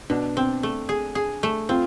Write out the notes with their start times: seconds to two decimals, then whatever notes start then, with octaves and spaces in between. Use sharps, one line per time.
0.10 B2 D4
0.37 C4
0.63 A3
0.89 G#4
1.15 G#4
1.43 A3
1.69 C4 F4